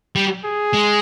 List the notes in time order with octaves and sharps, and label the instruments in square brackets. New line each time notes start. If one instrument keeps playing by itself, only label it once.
[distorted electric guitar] G3
[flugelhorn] G#4
[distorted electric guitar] G#3